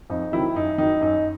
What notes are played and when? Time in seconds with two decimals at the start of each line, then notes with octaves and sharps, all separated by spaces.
0.10 F2 D#4
0.32 C3 D#3 F#3 E4
0.55 F#2 D#4
0.78 D#3 F#3 D#4
1.01 F#2 D#4